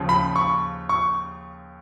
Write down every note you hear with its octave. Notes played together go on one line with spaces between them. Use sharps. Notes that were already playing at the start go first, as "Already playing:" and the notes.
Already playing: D#2 C#3 F3
B5
C#6
C#6